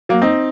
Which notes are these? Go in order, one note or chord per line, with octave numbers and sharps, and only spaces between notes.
F#3 A#3
C4 D#4